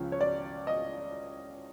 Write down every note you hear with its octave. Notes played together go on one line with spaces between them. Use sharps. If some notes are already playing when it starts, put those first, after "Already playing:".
Already playing: C#2 C#3 F3
C#5
D5
D#5